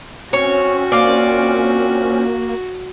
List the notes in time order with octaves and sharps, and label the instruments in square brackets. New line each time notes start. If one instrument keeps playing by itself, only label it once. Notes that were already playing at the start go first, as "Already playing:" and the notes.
[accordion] C4 C#4 [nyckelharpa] F#4 [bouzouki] C#5
[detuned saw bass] A#3 [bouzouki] F4 D5